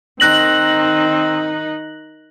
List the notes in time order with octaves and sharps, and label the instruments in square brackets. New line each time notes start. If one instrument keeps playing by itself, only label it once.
[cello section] D#3 D#4 [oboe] C4 [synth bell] F#6 A#6 F#7